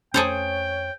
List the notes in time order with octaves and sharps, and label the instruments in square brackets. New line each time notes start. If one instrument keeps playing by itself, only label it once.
[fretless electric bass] F2 A3 C#4 [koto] G#4 A4 C5 [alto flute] C#5 [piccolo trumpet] G5